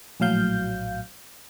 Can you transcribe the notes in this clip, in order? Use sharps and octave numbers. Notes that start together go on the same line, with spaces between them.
A#1 A2 F#3 F5 G6